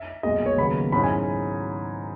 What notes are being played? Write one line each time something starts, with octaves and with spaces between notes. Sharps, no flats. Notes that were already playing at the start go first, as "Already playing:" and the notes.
Already playing: E5
B1 A#2 G#3 D#5
C#5
D#2 C#3 F#3 B3 B5
G#2 F#3 C#4 E4 B5
G#5